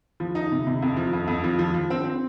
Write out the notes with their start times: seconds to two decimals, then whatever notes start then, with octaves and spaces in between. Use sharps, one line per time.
0.20 F3
0.35 D#4
0.52 C3
0.67 C3
0.82 F2
0.97 F3
1.13 F2
1.28 F2
1.44 F3
1.59 F3
1.74 F3
1.90 C4
2.05 C4